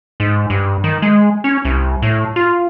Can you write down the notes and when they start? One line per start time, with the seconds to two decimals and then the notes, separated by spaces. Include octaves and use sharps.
0.20 G#2
0.50 G2
0.84 D#3
1.02 G#3
1.44 C#4
1.65 C2
2.02 A2
2.36 F4